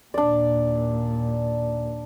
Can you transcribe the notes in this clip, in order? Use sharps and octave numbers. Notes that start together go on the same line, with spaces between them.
D#2 A#2 D4 D5